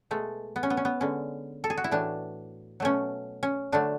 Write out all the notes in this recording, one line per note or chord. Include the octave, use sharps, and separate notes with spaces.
B2 G#3 A3
B3
C#4
B3
C#4
B3
D3 G#3 C#4
A4
G#4
F#4
E4
A2 E3 A3 D4
B2 F#3 A3 C#4
C#4
D3 F#3 A3 D4